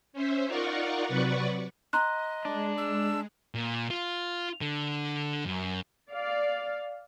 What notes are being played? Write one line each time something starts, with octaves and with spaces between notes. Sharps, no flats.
C#4 C5 E5
D#4 F4 A#4 D5 F#5 C#6
C3 F#3 B4 D5 F#5 C#6
D#5 A#5 C6 F#6
G#3 D4
E6
A#2
F4
D3
F#2
D5 F5